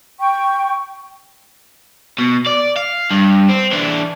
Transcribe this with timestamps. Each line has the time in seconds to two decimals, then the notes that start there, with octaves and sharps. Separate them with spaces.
0.20 G5 C#6
2.18 B2
2.47 D5
2.77 F5
3.11 G2
3.49 C4
3.72 E3 D4